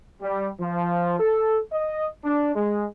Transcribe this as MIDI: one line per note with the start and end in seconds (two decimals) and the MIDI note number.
0.21 0.48 55
0.60 1.19 53
1.20 1.58 69
1.72 2.07 75
2.24 2.52 62
2.55 2.85 56